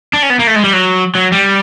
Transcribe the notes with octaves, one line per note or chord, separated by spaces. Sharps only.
D4
C#4
B3
A#3
A3
G#3
G3
F#3
F#3
G3